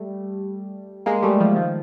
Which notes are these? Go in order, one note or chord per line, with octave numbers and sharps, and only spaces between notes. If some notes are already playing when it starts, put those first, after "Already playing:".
Already playing: G3 A3
G#3 A#3
G3 A3
F3 G3
D#3 F3